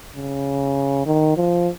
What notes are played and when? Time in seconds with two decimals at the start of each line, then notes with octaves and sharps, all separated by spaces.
0.16 C#3
1.06 D#3
1.37 F3